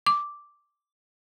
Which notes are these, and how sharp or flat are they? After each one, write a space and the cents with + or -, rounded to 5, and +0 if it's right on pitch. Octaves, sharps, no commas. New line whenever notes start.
D6 -5